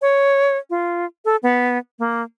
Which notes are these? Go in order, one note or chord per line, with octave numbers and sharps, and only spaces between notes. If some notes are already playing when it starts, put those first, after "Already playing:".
C#5
F4
A4
B3
A#3